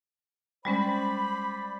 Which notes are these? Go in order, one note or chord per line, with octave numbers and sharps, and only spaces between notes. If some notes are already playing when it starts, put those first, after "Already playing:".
G3 G#3 C#4 C5 D5 B5